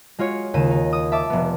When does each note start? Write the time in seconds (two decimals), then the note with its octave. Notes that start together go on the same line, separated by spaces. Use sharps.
0.19 G#3 F4 F#4 C#5
0.54 D#2 C#3 D#7 E7
0.71 D#4
0.93 D#6
1.12 E5 A5 D6
1.30 F1 B3